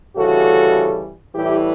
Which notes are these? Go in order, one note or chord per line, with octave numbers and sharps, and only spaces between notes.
D2 C#3 E3 G3 F#4 A4
A2 E3 G3 E4 G4